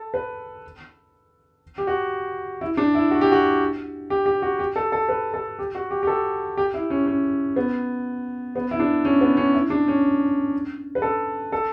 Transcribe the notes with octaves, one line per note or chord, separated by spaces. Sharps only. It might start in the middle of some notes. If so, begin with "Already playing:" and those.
Already playing: A4
B4
G4
F#4
E4
D4
E4
F#4
G4
F#4
G4
G4
F#4
G4
A4
A4
B4
A4
G4
F#4
G4
G4
A4
G4
E4
C#4
C#4
B3
B3
E4
D4
C#4
B3
C#4
E4
D4
C#4
B4
A4
A4